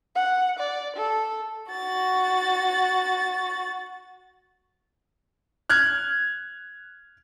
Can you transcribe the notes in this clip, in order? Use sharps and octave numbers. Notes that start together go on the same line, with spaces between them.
F#5
D5
A4
F#4 A6
F6 F#6 G#6